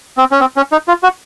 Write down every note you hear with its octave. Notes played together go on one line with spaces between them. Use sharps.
C4
C#4
C4
C#4
D#4
F4
F#4